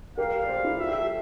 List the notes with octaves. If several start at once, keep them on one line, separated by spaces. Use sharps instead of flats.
G4 A#4 F5
D5
A4 C5
E4
F4 E5
G4
A4